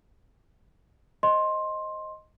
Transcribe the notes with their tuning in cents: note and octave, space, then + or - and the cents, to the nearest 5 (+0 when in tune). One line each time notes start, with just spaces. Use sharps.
C5 +20 D#5 +0 C6 +15